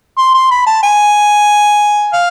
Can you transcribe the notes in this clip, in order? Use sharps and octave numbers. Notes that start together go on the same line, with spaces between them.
C6
C6
B5
A5
G#5
F5